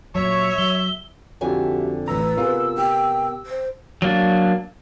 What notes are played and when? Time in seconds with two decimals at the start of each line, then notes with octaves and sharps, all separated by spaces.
0.15 A#2 F#3 C#5 E5
0.58 F#3 G7
1.41 F2 D3 F#4 G4 E5 G#5
2.08 A1 A2 B4 A#5 E6
2.37 C3 B3 F4 G#4 A#4
2.78 G4 G5
3.46 C5
4.02 F#3 A#3 D4